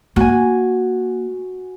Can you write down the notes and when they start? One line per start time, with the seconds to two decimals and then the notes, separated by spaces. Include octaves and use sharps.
0.16 A#3 F#4 G#5